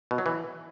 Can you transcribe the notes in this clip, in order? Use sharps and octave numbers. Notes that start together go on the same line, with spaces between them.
B2
F#3
E3